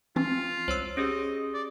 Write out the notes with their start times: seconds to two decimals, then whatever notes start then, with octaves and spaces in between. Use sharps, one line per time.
0.16 E3 C4 C#4 F4
0.68 C2 C5 C#5 E6
0.97 C#4 G4 G#4 D#5
1.54 D5